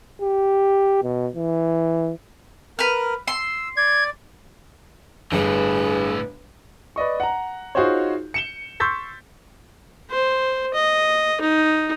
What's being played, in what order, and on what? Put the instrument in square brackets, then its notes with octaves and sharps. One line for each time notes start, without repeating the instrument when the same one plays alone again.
[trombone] G4
B2
E3
[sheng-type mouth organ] A#4 [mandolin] B4 F6
[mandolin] C6 [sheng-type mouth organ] E6
[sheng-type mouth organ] D5 [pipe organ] G#6
[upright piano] G1 [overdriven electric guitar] A2 D3 [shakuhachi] G#4 [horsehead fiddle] B4
[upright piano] B4 D5 D#5 C#6
F#5 A#5
D#4 F4 F#4 G#4 C5 C#5
C#7 E7 G7
C6 C#6 E6 G6 A6 B6
[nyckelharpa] C5
D#5
D#4